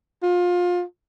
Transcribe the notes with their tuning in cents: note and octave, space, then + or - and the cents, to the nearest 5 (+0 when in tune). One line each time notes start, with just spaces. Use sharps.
F4 +25